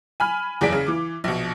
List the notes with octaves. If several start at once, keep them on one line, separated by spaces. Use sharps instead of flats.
G#5 B5 F6
F#1 E2 G#4 D5 B6 D7
C#3
E3 D6
A#1 B2